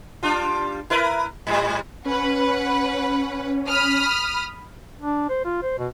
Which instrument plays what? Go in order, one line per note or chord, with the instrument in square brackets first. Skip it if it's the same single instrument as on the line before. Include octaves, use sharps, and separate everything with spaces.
[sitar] G3 D4 F4
E4 A#4 B4
G#2 G3
[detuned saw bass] C#4 [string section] B4 F#5
[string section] B5 D#6 F6
[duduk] D4
C5
F4
C5
B2